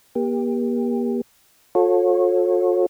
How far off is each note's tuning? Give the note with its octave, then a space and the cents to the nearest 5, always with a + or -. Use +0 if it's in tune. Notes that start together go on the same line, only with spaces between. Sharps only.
A#3 +40 G4 +25
F4 +45 A4 +0 C#5 -30